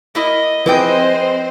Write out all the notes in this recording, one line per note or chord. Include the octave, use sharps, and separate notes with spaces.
A#3 E4 A#4 D#5
F3 C4 E4 G#4 B4 C5 D#5 G5